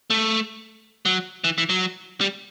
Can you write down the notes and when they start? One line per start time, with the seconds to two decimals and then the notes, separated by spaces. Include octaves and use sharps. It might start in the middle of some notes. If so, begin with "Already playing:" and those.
0.10 A3
1.05 F#3
1.44 E3
1.58 E3
1.69 F#3
2.21 G3